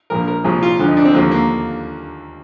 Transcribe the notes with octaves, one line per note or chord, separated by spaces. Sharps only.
A#1 A#2 F3 A#4
A#4
C2 A#2 F3 G#4
F4
D2 D3 F3
D#4
D4
C4
D#2 D3 F3 A#3
A#3